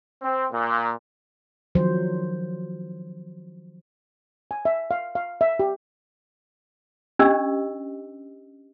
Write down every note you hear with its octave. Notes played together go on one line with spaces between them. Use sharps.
C4
A#2
D#3 F3 F#3 C5
G#5
E5
F5
F5
E5
G4
C#4 D4 G4 D#5 E6